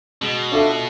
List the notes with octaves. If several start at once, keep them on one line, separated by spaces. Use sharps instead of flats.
B2 G#3
D4 F4 A4 E5